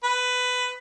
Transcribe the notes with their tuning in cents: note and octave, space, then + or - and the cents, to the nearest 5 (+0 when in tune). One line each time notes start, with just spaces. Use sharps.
B4 +15